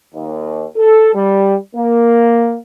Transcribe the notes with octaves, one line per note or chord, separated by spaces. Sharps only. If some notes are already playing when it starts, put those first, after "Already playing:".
D#2
A4
G3
A#3